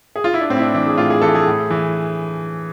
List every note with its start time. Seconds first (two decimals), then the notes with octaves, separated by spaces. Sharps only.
0.16 G#4
0.24 F4
0.34 E4
0.41 D4
0.50 A2 C4
0.57 E4
0.62 D4
0.74 E3 D4
0.86 G#4
0.98 A2 F4
1.10 G#4
1.22 E3 A4
1.35 G#4
1.47 A2
1.70 E3